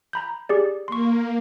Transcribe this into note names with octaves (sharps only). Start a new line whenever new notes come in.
A#5 B5 G6
G4 G#4 D5
A#3 C6 C#6